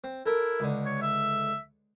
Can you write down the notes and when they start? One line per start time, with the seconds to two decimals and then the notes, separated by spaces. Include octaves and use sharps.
0.04 C4
0.26 E4 A4 A#4
0.60 C#2 D3
0.85 C#5
1.01 E5